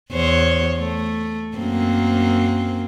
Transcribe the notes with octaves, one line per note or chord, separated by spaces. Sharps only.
E2 C5 C#5
A3
F#2 A#3 C4